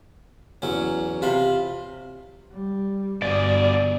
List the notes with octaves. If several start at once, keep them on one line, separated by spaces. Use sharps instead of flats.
E2 F#3 C#4
C3 F4 B5
G3
G1 B2 G#4 D5